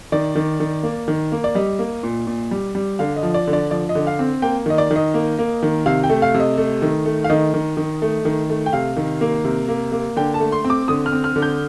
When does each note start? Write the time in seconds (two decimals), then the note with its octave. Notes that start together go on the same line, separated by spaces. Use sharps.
0.12 D#3 D5
0.35 D#3
0.60 D#3
0.83 A#3
1.08 D#3
1.32 A#3
1.44 D5
1.55 G3 D#5
1.79 A#3
2.03 A#2
2.27 A#2
2.51 G3
2.75 G3
2.99 D3 F5
3.16 D#5
3.23 F3
3.34 D5
3.47 D3
3.53 D5
3.70 F3 D5
3.89 D#5
3.95 D3
4.07 F5
4.19 C4
4.42 A#3 G5
4.66 D#3 D#5
4.78 D5
4.91 D#3
4.96 D#5
5.14 A#3
5.39 A#3
5.63 D#3
5.86 C3 F5
6.04 G5
6.10 A3
6.22 F5
6.34 C3
6.40 D#5
6.58 A3
6.82 D#3
7.06 A3
7.24 F5
7.30 D#3 D#5
7.54 D#3
7.77 D#3
8.02 A3
8.25 D#3
8.50 A3
8.66 G5
8.73 C3 F5
8.97 D#3
9.21 A#3
9.45 C3
9.69 A#3
9.92 A#3
10.16 D3 G5
10.34 A5
10.40 A3
10.52 C6
10.64 C4
10.70 D6
10.88 D3 D#6
11.06 F6
11.12 C4
11.24 F6
11.36 D3
11.42 G6